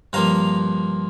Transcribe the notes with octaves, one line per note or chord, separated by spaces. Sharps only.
G2 F3 A#3 F5 A#5